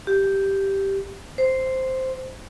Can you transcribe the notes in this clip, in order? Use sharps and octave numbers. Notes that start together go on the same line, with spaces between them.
G4
C5